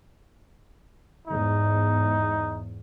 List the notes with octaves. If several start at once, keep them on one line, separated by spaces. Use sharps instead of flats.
E2 G#2 D#4